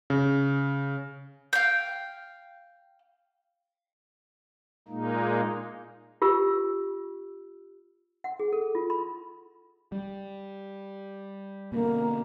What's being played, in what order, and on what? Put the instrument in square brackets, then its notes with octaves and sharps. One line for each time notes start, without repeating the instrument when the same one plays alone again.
[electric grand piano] C#3
[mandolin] F5 G5
[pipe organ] A#2 G#3 A#3 D#4
[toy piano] F4 G4 E6
F#5
G#4
A4
F4
B5
[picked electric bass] G3
[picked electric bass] B2 D3 [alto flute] A#3